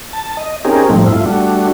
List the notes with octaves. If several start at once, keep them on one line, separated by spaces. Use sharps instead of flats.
A5
D#5
C4 C#4 D#4 G4 G#4 A#4
A2 F3 G3 A3 C4 D#4
G2 A3 E4 F4
G3 A3 D4 F#4